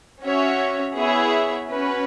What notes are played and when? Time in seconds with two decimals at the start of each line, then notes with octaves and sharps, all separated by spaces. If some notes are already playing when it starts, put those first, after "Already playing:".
0.22 C#4 F#4 C#5 E5
0.95 B3 E4 G#4 C#5 E5
1.68 C#4 F#4 B4